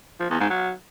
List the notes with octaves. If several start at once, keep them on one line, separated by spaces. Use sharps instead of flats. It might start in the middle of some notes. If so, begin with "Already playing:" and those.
F3
E2
G#2
F#3